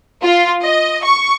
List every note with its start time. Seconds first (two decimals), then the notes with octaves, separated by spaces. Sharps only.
0.22 F4
0.62 D#5
1.03 C#6